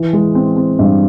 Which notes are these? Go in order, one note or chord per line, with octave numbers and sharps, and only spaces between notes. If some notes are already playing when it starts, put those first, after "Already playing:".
Already playing: E3
G#3
C4
C4
G2